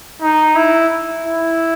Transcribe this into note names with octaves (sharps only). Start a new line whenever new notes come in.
D#4
E4
E4